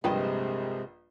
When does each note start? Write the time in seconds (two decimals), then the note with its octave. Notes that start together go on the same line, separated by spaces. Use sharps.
0.04 A#1 G2 C3 G#3 F4 B4 D#5 G5